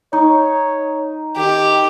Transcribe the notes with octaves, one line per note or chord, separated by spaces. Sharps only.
D#4 C#5
D#3 G4